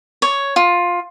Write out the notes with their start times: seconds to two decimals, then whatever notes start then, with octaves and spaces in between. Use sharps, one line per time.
0.22 C#5
0.56 F4